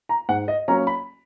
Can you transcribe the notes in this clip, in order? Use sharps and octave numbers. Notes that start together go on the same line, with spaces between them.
A#5
G#2 F#5
D#5
F#3 A#3 C#4 A#5
B5